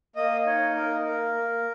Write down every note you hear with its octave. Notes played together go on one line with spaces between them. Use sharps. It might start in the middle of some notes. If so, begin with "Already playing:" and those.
A#3 D#5
D#4 C#5
A#3 A#4
A#3 A#4
A#3